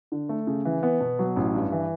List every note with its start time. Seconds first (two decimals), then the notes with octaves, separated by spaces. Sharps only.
0.12 D3
0.29 A3
0.47 C#3
0.65 E3
0.83 B3
1.01 B2
1.19 F#3
1.36 A1
1.55 G2
1.72 E3